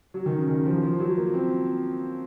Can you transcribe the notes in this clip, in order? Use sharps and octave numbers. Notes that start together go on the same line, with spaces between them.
F#3
D#3
C#3
D#3
F3
F3
F#3
A#3
C4